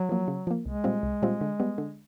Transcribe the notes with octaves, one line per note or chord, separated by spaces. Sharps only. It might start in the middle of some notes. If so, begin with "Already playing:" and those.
Already playing: F#3
F3 A#3
C#3
F3 A#3
C2 G#3
A#2 G3 C4 F4
C2
A#2 G3 C4 F4
D3
G3 B3
D3